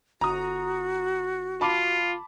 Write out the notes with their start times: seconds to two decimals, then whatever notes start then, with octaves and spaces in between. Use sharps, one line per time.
0.21 G1 F#4 A#5 D#6
1.61 F4 A5 B5 D6